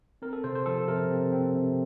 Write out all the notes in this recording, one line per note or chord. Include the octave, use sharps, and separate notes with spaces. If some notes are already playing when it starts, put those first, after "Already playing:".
C4 A#4
A4
C3 C5
C5
F3 A4
C3 A#4
C4
C4
C3